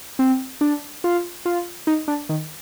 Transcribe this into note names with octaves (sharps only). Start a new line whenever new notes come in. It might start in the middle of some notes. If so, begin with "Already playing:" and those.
C4
D4
F4
F4
D#4
D4
D#3